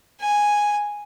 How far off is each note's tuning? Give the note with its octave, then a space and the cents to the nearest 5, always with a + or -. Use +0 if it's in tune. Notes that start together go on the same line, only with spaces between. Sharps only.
G#5 -5